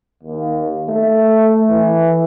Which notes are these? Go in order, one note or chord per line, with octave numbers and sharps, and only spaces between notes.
D#2
A3
E3